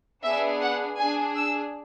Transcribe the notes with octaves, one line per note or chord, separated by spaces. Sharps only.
B3 D4 G#4 E5
F#5
D4 G#4 G#5
E6